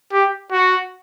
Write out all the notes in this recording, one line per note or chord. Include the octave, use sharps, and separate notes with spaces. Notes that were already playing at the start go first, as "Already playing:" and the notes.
G4
F#4